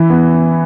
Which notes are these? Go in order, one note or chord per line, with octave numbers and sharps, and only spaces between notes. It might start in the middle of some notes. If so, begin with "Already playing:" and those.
Already playing: E3 E4
B3